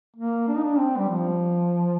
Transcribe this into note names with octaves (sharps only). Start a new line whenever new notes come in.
A#3
D4
D#4
D4
C4
G3
F3